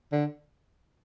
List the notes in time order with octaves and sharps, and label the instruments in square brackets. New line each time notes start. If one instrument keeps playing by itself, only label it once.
[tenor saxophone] D3